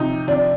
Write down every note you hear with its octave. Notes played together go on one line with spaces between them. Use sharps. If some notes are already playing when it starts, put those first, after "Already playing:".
Already playing: C3 F3 D#4
C3 F3 D4